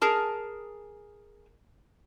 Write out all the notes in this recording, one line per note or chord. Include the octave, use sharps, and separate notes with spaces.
G#4 A#4 A5